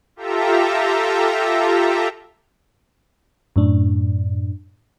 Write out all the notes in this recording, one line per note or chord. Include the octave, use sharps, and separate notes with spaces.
F4 G4 A4 E5 A#5
F#2 A2 D4